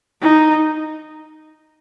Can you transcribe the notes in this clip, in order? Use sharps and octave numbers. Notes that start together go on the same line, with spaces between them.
D#4